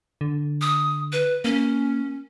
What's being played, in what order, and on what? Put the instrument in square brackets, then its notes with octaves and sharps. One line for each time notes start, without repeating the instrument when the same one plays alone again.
[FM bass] D3
[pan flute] D#6
B4
[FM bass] A#3 [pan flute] C#4